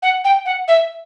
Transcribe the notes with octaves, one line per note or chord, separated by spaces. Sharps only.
F#5
G5
F#5
E5